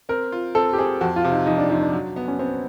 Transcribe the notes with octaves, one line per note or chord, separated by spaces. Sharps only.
C4 A#4
F4
C4 A4
G4
C4 G#4
F2 F#4
F4
C3
D#4
F2 D#4
D4
F2 D#4
D4
F#3
B3
C#4
B3 C4